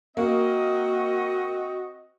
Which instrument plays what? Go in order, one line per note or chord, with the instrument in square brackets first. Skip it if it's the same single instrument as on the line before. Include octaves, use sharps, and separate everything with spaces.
[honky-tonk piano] A#3 [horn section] C4 F#4 D#5